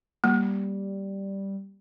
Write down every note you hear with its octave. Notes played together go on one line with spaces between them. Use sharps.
G3 A#3